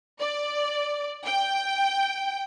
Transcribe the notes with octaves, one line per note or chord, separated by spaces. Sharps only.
D5
G5